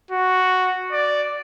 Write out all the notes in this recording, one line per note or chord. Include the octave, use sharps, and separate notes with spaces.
F#4
D5